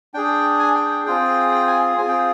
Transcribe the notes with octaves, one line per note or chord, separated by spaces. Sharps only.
D4 G#4 G5
G#5
G5
G5
C4 F4 G#4 G5
G5
G#5
C4 F4 G#4 G#5
G5